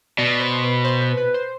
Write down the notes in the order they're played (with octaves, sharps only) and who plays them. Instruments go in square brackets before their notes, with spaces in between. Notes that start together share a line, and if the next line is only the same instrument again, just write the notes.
[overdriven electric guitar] B2 [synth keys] D5
[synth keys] C5
B4
C5
B4
B4
C5